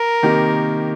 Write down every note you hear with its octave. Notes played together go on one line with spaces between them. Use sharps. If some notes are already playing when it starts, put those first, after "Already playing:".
Already playing: A#4
C3 D#3 A#3 D#4 G4